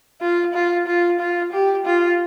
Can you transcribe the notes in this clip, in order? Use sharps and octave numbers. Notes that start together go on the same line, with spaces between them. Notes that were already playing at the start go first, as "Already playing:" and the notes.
F4
F4
F4
F4
G4
F4